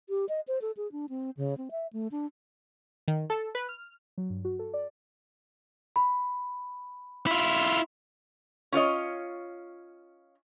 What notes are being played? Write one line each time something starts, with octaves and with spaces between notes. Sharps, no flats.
G4
D#5
C5
A4
G#4
D4
C4
C#3
C4
E5
A3
D4
D#3
A4
B4
F6
F#3
G2
F#4
A4
D5
B5
E4 F4
C#4 F4 C#5 D#5